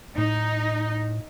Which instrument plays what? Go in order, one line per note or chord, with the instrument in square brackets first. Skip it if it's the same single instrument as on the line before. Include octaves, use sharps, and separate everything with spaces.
[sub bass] A2 [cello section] D#4